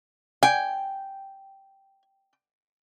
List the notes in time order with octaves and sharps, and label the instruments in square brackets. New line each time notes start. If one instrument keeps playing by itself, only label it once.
[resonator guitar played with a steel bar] G5 [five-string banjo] G#5